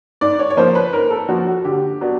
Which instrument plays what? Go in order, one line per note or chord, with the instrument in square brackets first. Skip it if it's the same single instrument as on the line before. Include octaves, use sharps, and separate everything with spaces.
[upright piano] G#2 D5
C#5
C#5
F3 A#3 C#4 C5
B4
G#2 A#4
A4
F3 A#3 C#4 F#4
F#4
D3 G4
F#3 B3 D4